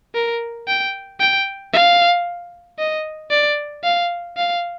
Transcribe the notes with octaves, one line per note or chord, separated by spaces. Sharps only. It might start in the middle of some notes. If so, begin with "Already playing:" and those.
A#4
G5
G5
F5
D#5
D5
F5
F5